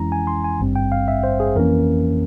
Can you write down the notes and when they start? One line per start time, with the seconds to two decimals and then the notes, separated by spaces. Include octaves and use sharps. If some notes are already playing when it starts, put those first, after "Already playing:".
Already playing: F2 E3 G#3 C#4 E4 A#5
0.12 G#5
0.27 C6
0.44 G#5
0.60 G#1 G2 G3 C4
0.76 G5
0.92 F5
1.08 E5
1.23 C5
1.40 G#4
1.56 F2 E3 A#3 C#4 A#4